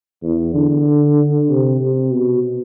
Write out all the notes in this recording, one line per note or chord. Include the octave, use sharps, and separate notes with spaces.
E2
D3
C3
C3
B2